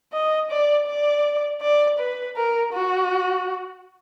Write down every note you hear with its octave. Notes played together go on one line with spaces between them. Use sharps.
D#5
D5
D5
D5
B4
A#4
F#4